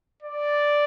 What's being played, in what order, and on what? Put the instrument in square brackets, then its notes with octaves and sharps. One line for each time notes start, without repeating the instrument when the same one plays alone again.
[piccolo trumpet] D5